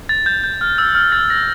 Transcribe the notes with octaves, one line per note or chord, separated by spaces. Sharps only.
A6
G6
G6
F6
E6
F6
A6
A#6